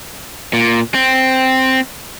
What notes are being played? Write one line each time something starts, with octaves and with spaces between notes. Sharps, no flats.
A#2
C4